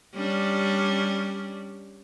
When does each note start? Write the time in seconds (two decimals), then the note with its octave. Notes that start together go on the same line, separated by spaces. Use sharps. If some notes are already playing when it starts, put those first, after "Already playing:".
0.14 G3 C#4 D4